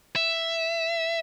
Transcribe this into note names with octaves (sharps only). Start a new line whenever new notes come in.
E5